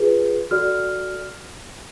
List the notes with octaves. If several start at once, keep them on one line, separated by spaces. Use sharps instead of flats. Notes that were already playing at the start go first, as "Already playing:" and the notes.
Already playing: F4 G#4 B4
F#4 A4 D5 F6